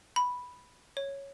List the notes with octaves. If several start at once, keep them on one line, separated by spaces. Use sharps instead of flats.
B5
C#5